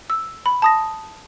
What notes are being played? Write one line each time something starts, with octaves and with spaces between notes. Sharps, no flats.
E6
B5
A5 D#6 A#6